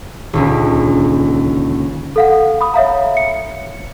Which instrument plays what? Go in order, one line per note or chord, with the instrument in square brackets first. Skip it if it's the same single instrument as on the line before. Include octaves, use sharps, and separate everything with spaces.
[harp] D#1 C#2 D3
[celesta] A4 F5 F#5
B5 D#6
C#5 E5 F5 A#5
C#7